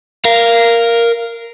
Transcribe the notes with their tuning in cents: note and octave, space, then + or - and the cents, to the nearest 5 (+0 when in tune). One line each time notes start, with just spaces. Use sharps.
A#4 +0 F5 -15